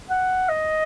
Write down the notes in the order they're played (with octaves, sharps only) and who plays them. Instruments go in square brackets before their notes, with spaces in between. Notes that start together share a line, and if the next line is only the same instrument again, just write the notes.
[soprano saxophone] F#5
D#5